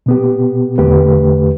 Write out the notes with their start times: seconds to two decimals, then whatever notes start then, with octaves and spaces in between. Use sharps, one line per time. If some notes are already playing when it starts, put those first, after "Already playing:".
0.06 B2 B3 G4
0.78 E2 D3 A3 G4 B4